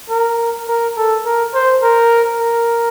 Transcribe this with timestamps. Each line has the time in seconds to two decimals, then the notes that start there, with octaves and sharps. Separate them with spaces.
0.10 A#4
0.68 A#4
0.97 A4
1.25 A#4
1.54 C5
1.83 A#4
2.40 A#4